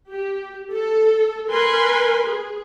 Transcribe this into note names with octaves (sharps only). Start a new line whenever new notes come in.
G4
A4
A#4 B4 G#5 C6
G#4